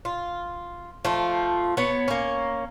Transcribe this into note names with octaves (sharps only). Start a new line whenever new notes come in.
F4
F3 A3 F4
B3 C#5
A#3 C#4